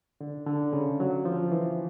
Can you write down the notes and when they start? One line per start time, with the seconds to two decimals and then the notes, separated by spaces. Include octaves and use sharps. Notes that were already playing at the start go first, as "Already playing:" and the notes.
0.21 D3
0.47 D3
0.73 C#3
1.00 F#3
1.25 F3
1.52 E3